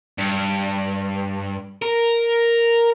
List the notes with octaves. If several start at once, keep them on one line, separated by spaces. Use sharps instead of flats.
G2
A#4